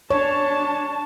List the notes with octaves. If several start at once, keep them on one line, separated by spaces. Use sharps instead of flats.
D4 C#5 A5